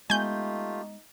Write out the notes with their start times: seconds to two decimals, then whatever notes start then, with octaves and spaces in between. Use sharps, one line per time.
0.10 G#3 A3 B3 D#4 F4 G4 G#5 G6